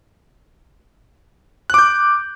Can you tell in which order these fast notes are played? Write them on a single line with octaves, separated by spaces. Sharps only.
F#6 D6 G6